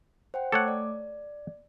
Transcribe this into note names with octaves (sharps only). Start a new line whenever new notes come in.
C5 F#5 G5
A3 A4 C#5 F#5 D6
D5